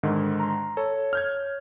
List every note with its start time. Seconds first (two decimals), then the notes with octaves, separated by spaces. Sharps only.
0.03 G#2 D3 D#3
0.40 A#5 C6
0.77 A4 C#5
1.13 F6 G6 G#6